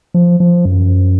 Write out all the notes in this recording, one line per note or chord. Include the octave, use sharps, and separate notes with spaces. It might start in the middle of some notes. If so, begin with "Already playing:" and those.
F3
F3
F#2